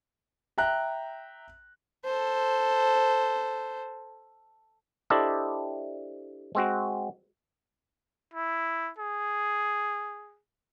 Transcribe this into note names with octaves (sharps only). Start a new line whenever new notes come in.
E5 G5 A#5 F#6
A4 C5
D4 E4 G4 A4 C5 D#5
G#3 C4 F#4
E4
G#4